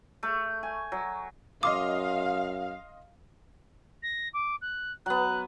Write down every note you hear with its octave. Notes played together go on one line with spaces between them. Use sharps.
A3
G#5
F#3
F#2 D#5 F5 C6 D6 D#6
A#6
D6
F#6
F#3 B3 F#6